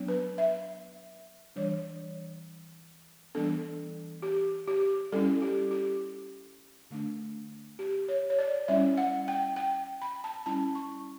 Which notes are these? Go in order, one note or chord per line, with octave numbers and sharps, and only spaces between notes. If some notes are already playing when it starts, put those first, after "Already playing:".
Already playing: F#3 B3 D4
B4
E5
E3 G3 D4 C#5
E3 G3 B3 D4 A4
G4
G4
G3 C#4 E4 A4
G4
G4
D3 A3 D4
G4
C#5
C#5
D5
G3 C#4 E4 E5
F#5
G5
G5
B5
A5
G3 C#4 E4 A5
C#6